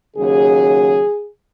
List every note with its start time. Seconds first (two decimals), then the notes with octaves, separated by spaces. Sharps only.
0.17 D#2 C#3 F#3 G#4